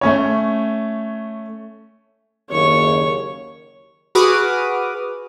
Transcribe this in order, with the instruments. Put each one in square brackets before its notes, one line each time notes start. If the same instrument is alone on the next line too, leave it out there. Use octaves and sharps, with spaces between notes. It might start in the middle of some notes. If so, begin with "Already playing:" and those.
[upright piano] A3 C#4 C#5
[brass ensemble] F#1 D#2 [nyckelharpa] C#5 C#6
[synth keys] F#4 G#4 B4 D6 D#6 F6